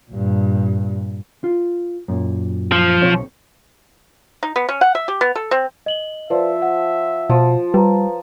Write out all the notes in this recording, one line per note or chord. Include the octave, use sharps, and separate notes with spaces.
G2 A#2
F4
F#2 A#2
F3
B1 C4 C#5
D#4
B3
C#4
F#5
E5
G4
B3
A4
C4
D#5 F#7 G7
F3 B4 D5 E5
F#5
B2 F3
G3 B4 A#5